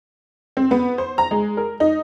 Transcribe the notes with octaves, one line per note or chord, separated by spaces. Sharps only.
C4
B3
C5
A#5
G#3
A#4
D#4